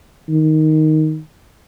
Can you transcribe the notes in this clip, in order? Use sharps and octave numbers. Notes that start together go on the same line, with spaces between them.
D#3